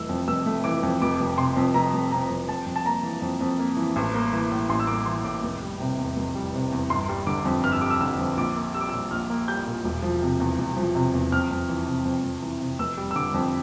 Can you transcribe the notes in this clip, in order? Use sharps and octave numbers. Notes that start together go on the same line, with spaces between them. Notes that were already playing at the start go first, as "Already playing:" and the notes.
Already playing: F1 E3 A3 E6
F2
F1 E6
A3
E3 D6
F2
F1 D6
F1
C3 C6
F2
F1 A#5
F1
C3 A#5
F2
F2 A5
F2
A5
A#3 A#5
E3
F2
F2
A#3
E3
A1
A#3
E3
A2
A1 C6
E6
A#3 D6
E3 C6
A2 D6
F1
G3
C3
E2
F1
G3
C3
E2
G1 C6
G3
D3 D6
F2
G1 F6
E6
G3 D6
E6
D3 E6
F2
A#1 D6
A#3
G3 E6
D6
A#2 E6
A#1 F6
A#3
G3 G6
A#2
E1
F3
C3
E2
E1
F3
C3
E2
F2 F6
F2
E3
C3
F2
F2
E3
C3
F1 E6
G3
E6
D3 D6
F2